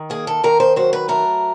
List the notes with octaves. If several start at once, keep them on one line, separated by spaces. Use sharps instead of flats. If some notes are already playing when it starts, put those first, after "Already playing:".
Already playing: D#3
A#3 G#4
A4
D#3 A#4
C5
F#3 C5
B4
A3 A#4